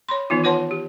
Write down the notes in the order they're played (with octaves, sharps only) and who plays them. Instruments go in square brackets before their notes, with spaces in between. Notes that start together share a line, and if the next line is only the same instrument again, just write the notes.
[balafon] C#5 B5 C6
D#3 E3 B3 D#4 F4
F4 B4 C#5 F#5 A5 C6
G4